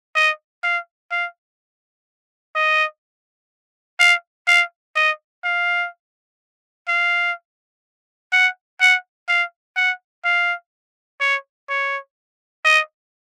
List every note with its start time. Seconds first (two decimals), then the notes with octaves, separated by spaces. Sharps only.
0.16 D#5
0.63 F5
1.11 F5
2.55 D#5
4.00 F5
4.48 F5
4.96 D#5
5.44 F5
6.88 F5
8.33 F#5
8.81 F#5
9.29 F5
9.77 F#5
10.25 F5
11.21 C#5
11.69 C#5
12.65 D#5